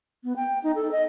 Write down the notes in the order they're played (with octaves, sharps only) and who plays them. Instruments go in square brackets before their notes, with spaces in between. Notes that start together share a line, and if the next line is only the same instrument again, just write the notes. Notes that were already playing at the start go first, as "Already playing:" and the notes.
[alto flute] B3
G5
D#4
A4
D#5